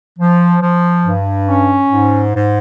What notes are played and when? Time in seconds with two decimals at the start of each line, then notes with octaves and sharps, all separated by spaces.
0.19 F3
0.62 F3
1.05 G2
1.49 C#4
1.91 G#2
2.34 G#2